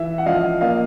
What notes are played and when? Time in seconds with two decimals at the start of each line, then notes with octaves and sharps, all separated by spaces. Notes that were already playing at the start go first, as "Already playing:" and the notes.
Already playing: E3 E5
0.18 F#5
0.26 F3 D#5 F5
0.61 A#3 D#5 F5